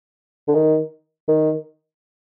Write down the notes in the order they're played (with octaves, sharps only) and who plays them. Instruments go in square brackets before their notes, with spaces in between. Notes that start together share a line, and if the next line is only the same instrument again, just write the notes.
[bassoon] D3
D#3
D#3